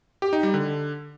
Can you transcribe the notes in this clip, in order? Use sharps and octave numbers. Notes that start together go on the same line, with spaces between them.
G4
D#4
G3
D3